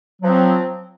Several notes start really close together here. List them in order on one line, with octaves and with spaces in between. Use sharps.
F#3 F3 C4